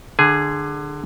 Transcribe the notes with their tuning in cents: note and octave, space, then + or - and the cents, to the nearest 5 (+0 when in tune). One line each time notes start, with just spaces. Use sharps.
D3 +20 G#4 +0 G#5 +0